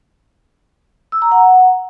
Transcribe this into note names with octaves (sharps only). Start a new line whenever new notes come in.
E6
A#5
F#5